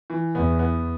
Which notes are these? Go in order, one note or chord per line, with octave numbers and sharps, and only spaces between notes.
E3
E2 B3
B3